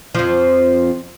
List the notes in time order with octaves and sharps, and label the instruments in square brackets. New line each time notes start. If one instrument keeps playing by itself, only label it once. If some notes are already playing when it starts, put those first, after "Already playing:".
[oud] F2 F3